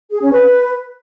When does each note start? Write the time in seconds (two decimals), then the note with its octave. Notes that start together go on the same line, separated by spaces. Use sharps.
0.11 G#4
0.22 C#4
0.32 B4